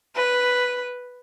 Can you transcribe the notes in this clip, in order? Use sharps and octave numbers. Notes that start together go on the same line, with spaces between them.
B4